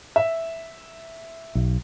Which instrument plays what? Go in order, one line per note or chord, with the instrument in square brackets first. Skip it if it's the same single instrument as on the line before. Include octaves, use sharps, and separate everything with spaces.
[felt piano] E5
[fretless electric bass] B1